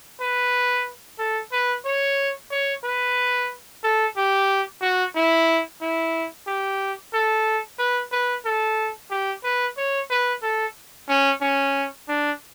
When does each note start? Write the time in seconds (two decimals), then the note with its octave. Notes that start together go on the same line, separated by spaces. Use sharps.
0.21 B4
1.19 A4
1.52 B4
1.85 C#5
2.51 C#5
2.84 B4
3.84 A4
4.17 G4
4.82 F#4
5.16 E4
5.81 E4
6.47 G4
7.14 A4
7.79 B4
8.12 B4
8.45 A4
9.10 G4
9.44 B4
9.77 C#5
10.10 B4
10.43 A4
11.09 C#4
11.41 C#4
12.08 D4